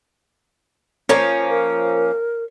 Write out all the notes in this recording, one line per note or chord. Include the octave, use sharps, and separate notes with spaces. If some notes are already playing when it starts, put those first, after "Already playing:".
F3 A#3 C#4 C#5
A#4